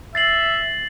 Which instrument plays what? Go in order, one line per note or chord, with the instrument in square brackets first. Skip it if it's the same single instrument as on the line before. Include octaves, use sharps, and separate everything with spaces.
[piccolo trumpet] E5 [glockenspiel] A6 C7 F#7